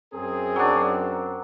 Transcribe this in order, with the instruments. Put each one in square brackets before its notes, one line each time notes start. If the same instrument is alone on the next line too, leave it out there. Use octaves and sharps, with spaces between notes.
[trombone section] F#2 C4 A#4 [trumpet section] G#4
[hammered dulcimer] F#3 D4